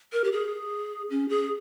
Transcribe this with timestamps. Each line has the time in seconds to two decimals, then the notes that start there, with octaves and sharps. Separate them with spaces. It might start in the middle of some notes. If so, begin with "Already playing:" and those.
0.13 A#4
0.24 G4
0.32 G#4
1.10 C#4
1.29 G#4